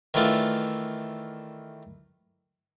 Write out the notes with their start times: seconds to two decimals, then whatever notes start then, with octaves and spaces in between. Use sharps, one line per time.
0.14 D#3 E3 A3 D4 F4